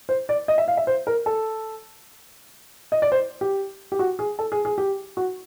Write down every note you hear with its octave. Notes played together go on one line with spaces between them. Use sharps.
C5
D5
D#5
E5
F5
E5
C5
A#4
A4
D#5
D5
C5
G4
G4
F#4
G#4
A4
G#4
G#4
G4
F#4